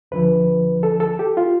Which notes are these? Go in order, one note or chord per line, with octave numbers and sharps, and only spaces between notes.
D2 D3 F3 B4
A4
A4
G4
F4